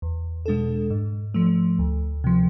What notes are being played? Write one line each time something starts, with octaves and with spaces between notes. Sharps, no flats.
E2
B2 G#3 D4 A4
G#2
F3 A3
D2
C3 F3